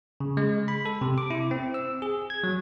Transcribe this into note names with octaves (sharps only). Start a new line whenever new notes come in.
C#3
G#3
B5
A4
C3
D6
E4
C4
E6
G#4
G#6
F#3